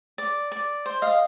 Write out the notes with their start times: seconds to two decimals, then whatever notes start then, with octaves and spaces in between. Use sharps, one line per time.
0.18 D5
0.52 D5
0.86 C5
1.02 D#5 F5